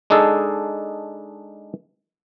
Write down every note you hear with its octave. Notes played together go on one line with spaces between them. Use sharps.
G#3 D4 D#4 G#4 A4